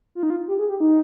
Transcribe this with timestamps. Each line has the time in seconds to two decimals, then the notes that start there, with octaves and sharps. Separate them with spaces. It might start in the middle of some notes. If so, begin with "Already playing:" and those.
0.15 F4
0.23 D#4
0.30 F4
0.48 G4
0.59 G#4
0.69 G4
0.80 D#4